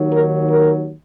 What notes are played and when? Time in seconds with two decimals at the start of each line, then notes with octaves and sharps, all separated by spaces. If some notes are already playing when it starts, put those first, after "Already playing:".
Already playing: D#2 D#3 F#3
0.11 A#4
0.48 A#4